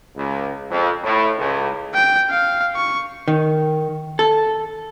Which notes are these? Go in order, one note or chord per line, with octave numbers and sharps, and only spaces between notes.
C#2
F2
A2
C#2
G5
F5
C#6
D#3
A4